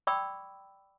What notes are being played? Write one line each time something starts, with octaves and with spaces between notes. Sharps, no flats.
D5 G5 B5 C#6 D6 E6